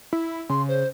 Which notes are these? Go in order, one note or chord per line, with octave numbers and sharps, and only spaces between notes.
E4
C#3 C6
C5